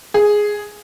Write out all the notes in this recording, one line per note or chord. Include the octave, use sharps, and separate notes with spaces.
G#4